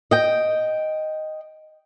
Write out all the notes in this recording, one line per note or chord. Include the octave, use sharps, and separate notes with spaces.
D#5 G5